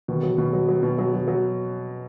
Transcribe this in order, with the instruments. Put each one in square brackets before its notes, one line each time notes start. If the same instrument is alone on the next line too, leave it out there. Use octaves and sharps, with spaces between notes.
[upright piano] B2 [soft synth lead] D#3
[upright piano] F#3
[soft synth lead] D#3
[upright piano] B2
F#3
F#3
B2
F#3
F#3
F#3